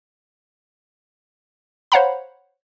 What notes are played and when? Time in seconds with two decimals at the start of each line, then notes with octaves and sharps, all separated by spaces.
1.92 C5 C#5 F5 F#5 A#5 B5